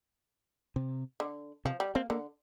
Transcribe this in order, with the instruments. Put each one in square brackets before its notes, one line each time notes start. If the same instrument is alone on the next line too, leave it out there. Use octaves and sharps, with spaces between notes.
[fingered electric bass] C3
[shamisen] D3
[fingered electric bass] C3 [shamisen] F3
[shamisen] G3
[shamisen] A#3 [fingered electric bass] C4
[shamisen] D3 [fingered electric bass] A#3